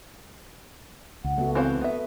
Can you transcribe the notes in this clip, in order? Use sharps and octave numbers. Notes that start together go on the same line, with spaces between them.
C#2 F#5
A3 B3 F#4
E3 C4 C5 F5
B3 B4 E5